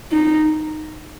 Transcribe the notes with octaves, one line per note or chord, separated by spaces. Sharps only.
D#4